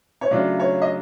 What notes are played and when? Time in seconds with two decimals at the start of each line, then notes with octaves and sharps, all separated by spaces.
0.21 C#5
0.31 C#3 F#3 A3 D4 F4 D5
0.60 C#5
0.82 D#5